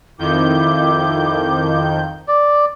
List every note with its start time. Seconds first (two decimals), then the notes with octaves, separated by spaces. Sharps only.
0.19 F2 D#3 E4 D6 G6
2.28 D5